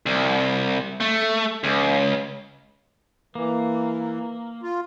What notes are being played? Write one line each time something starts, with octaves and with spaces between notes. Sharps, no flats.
C2
A3
C#2
E3 A#3
F4